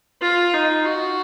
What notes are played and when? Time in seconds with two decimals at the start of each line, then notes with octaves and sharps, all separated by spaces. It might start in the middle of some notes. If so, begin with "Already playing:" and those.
0.22 F4
0.53 D#4
0.85 F#4